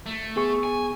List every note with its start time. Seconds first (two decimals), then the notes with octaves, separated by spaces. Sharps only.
0.06 A3
0.36 B3 G#4 C#6
0.63 G#5